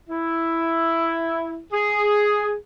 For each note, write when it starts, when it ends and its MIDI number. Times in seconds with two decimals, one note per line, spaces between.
0.09 1.61 64
1.73 2.53 68